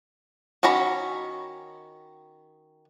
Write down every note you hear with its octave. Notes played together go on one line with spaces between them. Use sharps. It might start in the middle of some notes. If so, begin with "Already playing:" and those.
D#3 C#4 F#4 A#5 B5